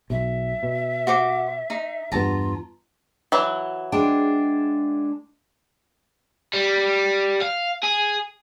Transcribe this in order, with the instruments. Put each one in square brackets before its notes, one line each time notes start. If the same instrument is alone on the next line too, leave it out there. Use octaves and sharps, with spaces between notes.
[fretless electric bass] B1 [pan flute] E5
[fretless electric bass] B2
[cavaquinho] F#4 C5 D6
D#4
[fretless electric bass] E2 G2 B3 [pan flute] F4 [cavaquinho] A5 A#5
[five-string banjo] E3 F#3
[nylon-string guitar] G#3 D4 G5
[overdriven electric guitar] G3
F5
G#4